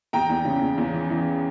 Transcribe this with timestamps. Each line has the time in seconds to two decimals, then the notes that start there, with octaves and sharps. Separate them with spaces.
0.13 E2 G5 A#5
0.29 E2
0.45 C#3
0.61 E2
0.78 E2
0.94 E3
1.10 E3